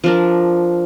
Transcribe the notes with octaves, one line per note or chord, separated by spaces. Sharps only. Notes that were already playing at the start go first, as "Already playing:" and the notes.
F3 D4 A#4